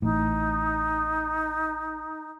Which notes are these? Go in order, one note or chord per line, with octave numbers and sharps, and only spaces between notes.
A1 A2 D#4